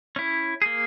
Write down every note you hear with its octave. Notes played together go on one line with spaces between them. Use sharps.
C#4 E4
A#3 G#4